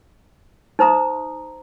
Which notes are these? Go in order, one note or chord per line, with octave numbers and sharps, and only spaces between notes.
D#4 C5 A#5 D#6